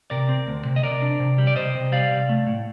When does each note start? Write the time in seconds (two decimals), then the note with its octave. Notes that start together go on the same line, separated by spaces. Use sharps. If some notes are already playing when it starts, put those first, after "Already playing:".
0.10 C3 A#4 D5
0.29 C4
0.47 D2
0.65 C3
0.76 D#5
0.83 C3 A#4 D5
1.02 D4
1.20 C3
1.38 G3
1.47 D5
1.56 C3 C5 D#5
1.75 C3
1.92 G3 D5 F5
2.11 C3
2.29 A3
2.47 A2